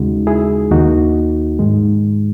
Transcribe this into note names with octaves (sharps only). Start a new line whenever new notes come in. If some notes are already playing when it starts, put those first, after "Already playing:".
Already playing: D#2 C#3 G#3 D#4 F#4
E4 G#4
D#2 D#3 A#3 D#4 F#4
G#2 D#3 G#3